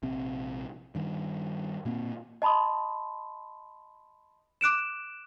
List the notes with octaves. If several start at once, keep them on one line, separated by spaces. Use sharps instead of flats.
A#1 C3 C4
G2 D#3
A#2 A#3 C4
D#5 A5 B5 C6 D#6
D6 F#6 D7 E7